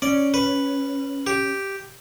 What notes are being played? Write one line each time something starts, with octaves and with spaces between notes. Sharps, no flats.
C#4 D5
B4
G4